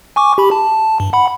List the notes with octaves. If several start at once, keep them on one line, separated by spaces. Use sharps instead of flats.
G#5 C#6 D6
G4 B5
A5
G2
F#5 B5